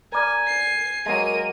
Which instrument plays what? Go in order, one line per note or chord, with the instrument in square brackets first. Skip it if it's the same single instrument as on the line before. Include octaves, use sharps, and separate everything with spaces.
[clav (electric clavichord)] A#4 D5 [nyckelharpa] G#5
[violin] C7
[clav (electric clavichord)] F#3 G#3 [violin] A#3 D#7